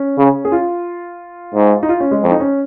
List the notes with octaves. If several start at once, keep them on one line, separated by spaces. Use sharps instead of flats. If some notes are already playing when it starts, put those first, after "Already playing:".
Already playing: C#4
C#3
G#4
F4
G#2
D#4
F4
C#4
G#3
F2
D#4
C#4